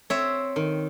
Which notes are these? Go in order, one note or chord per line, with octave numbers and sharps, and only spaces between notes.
C4 C#5 E5
D#3